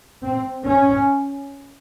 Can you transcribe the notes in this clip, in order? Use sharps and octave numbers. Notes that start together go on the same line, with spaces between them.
C4
C#4